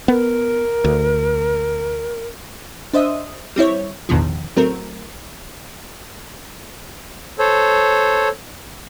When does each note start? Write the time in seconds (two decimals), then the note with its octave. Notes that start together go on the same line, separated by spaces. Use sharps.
0.08 B3 A#4
0.85 D2
2.93 D4 C5 D#5 E5 D#6
3.56 G3 C4 E4 C#5
4.09 A1 E2 B2 D3 D#3 F3
4.56 A1 F#3 A3 C4 A#4
7.39 A4 C5 C#5